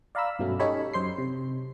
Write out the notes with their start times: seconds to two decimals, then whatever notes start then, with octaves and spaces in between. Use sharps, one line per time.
0.15 D5 F5 A#5 B5 E6
0.39 G2 B2 F#3 A3 C#4
0.59 C#4 D#4 G4 A4 C#5 B5
0.93 F#2 C5 C6 C7
1.18 C3